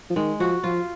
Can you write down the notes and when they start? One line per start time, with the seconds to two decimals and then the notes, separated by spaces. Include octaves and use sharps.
0.10 F3
0.16 D#3 G#3
0.40 F3 F#4
0.63 F3 F4